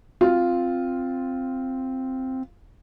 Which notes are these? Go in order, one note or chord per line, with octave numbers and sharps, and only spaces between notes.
C4 F4